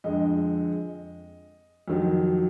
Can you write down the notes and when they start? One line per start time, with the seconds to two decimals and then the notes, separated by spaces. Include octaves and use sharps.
0.04 F2 D3 G#3 D#5
1.88 F2 D#3 F#3